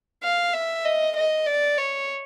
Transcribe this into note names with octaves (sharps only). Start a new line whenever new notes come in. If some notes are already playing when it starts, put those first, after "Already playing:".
F5
E5
D#5
D#5
D5
C#5